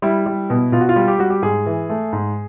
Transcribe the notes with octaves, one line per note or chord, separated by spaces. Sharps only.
G3 E4
G3
B2
B2 F4
F#4
F4
G3
G4
G3 F#4
G4
G#2 G#4
E3
A3
G#2